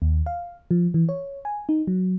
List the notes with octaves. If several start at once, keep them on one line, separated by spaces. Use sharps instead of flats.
D#2
F5
F3
E3
C#5
G#5
D#4
F#3